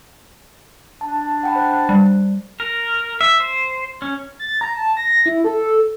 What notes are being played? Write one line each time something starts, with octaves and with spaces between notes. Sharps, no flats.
D4 A5
F#5 G5 B5
C5 F#6
G3
A#4
E5
C5
C#4
A6
A#5
A5
A#6
E4
A4